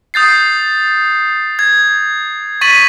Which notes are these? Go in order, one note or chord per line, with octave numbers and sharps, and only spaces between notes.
D#6 G6 A6 C7
G#6
C#6 A6 B6 D#7 F#7